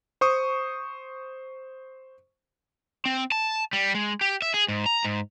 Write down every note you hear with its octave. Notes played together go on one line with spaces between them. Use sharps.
C5 C#6 D#6
C4
A5
G3
G#3
G4
E5
G#4
G#2
A#5
G#2